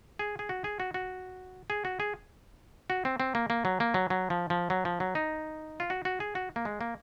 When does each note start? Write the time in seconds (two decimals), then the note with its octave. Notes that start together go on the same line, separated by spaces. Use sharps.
0.19 G#4
0.39 G#4
0.49 F#4
0.64 G#4
0.80 F#4
0.94 F#4
1.70 G#4
1.85 F#4
2.00 G#4
2.90 F#4
3.05 C4
3.20 C4
3.35 A#3
3.50 A#3
3.65 F#3
3.80 A#3
3.94 F#3
4.10 F#3
4.30 F3
4.50 F3
4.70 F#3
4.85 F3
5.00 F#3
5.15 D#4
5.80 F4
5.90 F#4
6.05 F#4
6.20 G#4
6.35 F#4
6.56 A#3
6.65 G#3
6.81 A#3